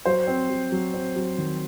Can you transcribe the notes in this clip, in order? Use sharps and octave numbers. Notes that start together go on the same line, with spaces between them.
F#3 C5
C4
F#3
F#3
C4
F#3
D#3